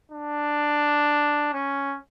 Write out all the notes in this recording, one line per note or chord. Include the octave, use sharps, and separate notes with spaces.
D4
C#4